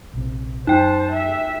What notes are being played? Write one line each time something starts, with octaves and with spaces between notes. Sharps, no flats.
A#1 C3
F#2 D#4 C5 G5 A5
E5 B6